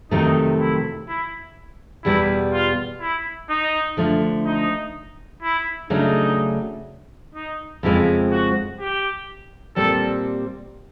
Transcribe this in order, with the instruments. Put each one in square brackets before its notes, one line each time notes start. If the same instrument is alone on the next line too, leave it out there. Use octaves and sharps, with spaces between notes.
[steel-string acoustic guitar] F2 C3 D#3 F#3 A3 [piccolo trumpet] D#4
[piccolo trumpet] E4
E4
[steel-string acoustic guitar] E2 B2 G3 B3 [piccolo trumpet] E4
[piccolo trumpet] F4
E4
D#4
[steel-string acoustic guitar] D3 F3 A3
[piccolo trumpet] D#4
E4
[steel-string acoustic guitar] C#3 F#3 A3 D4 [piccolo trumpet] D#4
[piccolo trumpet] D#4
[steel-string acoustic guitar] F2 C#3 F3 G#3 C4 [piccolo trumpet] E4
[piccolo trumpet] F#4
G4
[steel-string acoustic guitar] A#2 G3 C4 [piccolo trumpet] A4